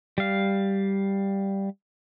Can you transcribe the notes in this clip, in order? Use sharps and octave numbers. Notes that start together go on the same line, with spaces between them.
G3 F5